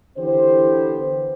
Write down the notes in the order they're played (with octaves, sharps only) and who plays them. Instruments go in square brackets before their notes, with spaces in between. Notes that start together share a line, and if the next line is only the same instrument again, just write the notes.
[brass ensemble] D3 E3 B3 G4 C5